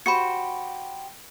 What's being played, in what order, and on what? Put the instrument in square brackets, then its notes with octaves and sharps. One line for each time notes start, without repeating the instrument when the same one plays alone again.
[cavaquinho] F#4 G4 C5 [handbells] B5 C#7